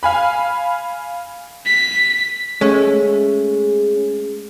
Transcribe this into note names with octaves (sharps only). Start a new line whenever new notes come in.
F5 G#5 B5
B6
G#3 A3 C#4